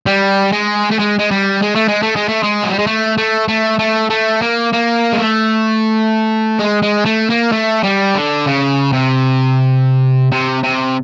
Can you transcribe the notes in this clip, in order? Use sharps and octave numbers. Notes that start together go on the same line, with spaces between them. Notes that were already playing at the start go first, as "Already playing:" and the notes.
G3
G#3
A3
G#3
G#3
G3
G#3
A3
G#3
A3
G#3
A3
G#3
F#3
G3
G#3
A3
A3
A3
A3
A3
A#3
A#3
G#3
A3
G#3
G#3
A3
A#3
A3
G3
D3
C#3
C3
C3
C3